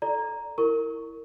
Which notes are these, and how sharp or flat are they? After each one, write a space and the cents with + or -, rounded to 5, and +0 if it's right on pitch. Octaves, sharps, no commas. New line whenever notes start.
A4 +0 D5 +0 A#5 +0
E4 -5 A#4 -20 C#6 +0